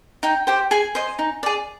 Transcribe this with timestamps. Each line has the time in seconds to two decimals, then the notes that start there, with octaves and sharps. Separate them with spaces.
0.23 D#4 G5
0.47 G4 C5 G5
0.71 G#4 G#5
0.95 C5 D#5
1.19 D#4
1.43 G#4 D5